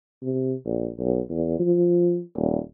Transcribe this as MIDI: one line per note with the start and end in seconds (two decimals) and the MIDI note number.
0.22 0.54 48
0.65 0.88 34
0.99 1.19 35
1.29 1.57 40
1.59 2.22 53
2.35 2.58 27